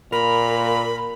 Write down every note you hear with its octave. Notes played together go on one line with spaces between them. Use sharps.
A#2 A#4 B5